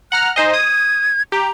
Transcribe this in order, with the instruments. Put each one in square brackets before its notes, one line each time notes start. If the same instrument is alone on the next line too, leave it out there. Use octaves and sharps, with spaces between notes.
[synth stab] F#5 A#5 F6 [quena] F#6
[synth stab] D#4 C5 D#5 [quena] G#5
[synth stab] D#6 [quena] G#6
[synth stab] G4 [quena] A#5